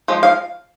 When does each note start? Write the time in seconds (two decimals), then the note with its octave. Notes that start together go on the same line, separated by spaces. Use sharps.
0.08 F3 G#3
0.23 F5